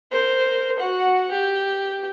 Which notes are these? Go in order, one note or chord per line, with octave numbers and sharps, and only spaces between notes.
A#4 C5
F#4 F#5
G4